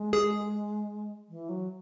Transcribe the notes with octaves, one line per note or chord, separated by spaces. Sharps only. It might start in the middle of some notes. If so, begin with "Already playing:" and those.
Already playing: G#3
G#4
E3
F#3